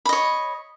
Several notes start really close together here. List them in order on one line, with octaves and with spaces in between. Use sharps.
B5 D#5 C#5